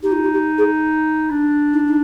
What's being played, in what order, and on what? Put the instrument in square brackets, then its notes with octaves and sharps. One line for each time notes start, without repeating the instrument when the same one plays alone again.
[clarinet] D#4 [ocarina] G4
[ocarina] F4
G4
G4
G#4
[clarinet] D4
[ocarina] D#4
D#4